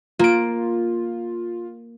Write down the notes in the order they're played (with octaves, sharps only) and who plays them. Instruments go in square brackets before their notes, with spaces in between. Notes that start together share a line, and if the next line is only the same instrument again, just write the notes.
[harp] A#3 D7 [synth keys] F4